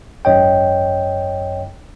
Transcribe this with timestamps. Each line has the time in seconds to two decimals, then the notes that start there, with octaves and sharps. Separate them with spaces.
0.25 G#1 F#2 C#5 D#5 G5